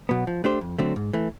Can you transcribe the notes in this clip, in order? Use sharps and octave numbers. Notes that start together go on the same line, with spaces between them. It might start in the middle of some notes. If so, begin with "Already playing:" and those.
B2 F#3 B3
F3
A3 D4 G4 C5
F2
D3 F#3 A3 C4
G#2
E3 A3